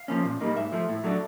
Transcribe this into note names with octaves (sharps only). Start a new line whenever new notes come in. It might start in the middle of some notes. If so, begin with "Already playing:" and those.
Already playing: F5
F3 A#3 C#4
A#2
G3 A#3 D#4
G#2 E5
F3 A3
A2
F#3 A3 D4